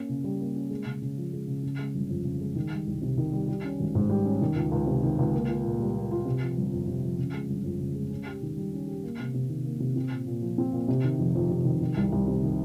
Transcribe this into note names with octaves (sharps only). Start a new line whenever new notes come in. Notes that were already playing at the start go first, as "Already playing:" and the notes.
Already playing: A#3 C#4
C#3
G3
A#3
C#4
G#3
C#3
C#3
F3
G#3
C#3
C#3
G#3
G1
F2
C#3
G#3
D#3
G3
C2
C3
D#3
G3
G3
C#4
G#1
G#2
G3
C#4
D#3
C#2
C#2
C3
D#3
C#2
A#3
F4
A#2
G3
A#3
F4
C3
F3
G1
F2
C3
F3
C#3
G#3
G1
F2
C#3
G#3
C#4
G4
D#3
G3
C#4
G4
A#3
C3
C3
D#3
A#3
C3
C4
A#2
A#2
F3
C4
A#2
C3
D#3
F1
F2
C3
D#3
D#3
C2
C2
C3
D#3